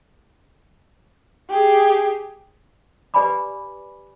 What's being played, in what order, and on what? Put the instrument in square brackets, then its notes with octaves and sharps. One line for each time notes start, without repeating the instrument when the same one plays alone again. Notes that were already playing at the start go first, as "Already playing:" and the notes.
[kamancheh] G4 G#4
[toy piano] G4 B4 D5 G#5 B5 D6